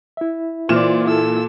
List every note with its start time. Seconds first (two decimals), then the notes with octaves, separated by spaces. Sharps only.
0.17 E4 E5
0.69 A#2 E3 C5 D5 F6 E7
1.07 E4 A4 E6